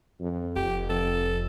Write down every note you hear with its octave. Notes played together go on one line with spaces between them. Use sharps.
F2
F1 G4
F2 A4